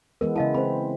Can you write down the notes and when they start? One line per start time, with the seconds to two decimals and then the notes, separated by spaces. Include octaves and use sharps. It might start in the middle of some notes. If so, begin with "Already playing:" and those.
0.21 E3 G#3 B3 A#4
0.36 C#3 E4 D#5 F5 A5
0.54 C4 C5 B5